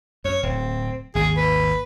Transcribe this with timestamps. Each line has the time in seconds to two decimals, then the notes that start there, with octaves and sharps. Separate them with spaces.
0.25 F#2 C#5
0.43 D1 C4
1.15 G#1 D#2 G#4
1.37 B4